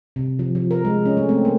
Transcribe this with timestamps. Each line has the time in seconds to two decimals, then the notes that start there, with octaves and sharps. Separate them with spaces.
0.16 C3
0.39 F3
0.55 F3
0.71 A#4
0.85 G#3
1.06 C#4
1.17 A3
1.29 C4
1.45 A#3